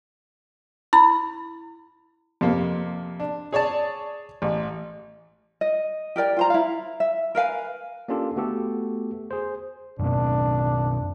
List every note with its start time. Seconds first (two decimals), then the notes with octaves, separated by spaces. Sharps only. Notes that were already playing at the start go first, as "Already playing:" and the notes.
0.93 E4 B5
2.41 F2 C3 A#3
3.20 D4
3.52 G#4 C#5 D5 A5
4.42 A1
5.61 D#5
6.16 G4 A#4 D5 G5
6.37 F4 C5 A#5
6.50 E4 F5
7.00 E5
7.35 A#4 B4 F5 G#5
8.08 A#3 C#4 D4 F4 G4 A4
8.36 A3 B3 F#4 G4 A4
9.31 G#4 C5
9.99 F#2 B2 C4 D4